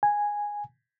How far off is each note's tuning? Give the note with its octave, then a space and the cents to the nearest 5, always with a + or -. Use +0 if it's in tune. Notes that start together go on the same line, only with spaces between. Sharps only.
G#5 -5